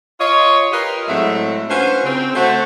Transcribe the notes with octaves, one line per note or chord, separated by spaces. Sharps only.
F4 C#5 D#5
F4 G4 A#4 B4 D#5
A2 F#3 G#3 A3 C4 E5
C#4 D4 F4 F#4 B4 C5
C#3 C4
A3 F#4 C5